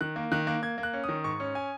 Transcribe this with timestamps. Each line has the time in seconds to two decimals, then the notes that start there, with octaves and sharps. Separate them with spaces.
0.01 D#3 F#6
0.16 A#3
0.32 D#3 F#6
0.47 A#3 F#6
0.62 A#3 G#6
0.78 A#3
0.83 F#6
0.93 C#4
1.04 D#3 D#6
1.24 G#2 C#6
1.40 C#4
1.55 G#5